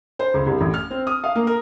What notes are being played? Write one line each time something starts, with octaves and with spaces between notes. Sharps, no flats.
C5
C#2
C2
A1
F6
C4
D#6
F5
A#3
A#4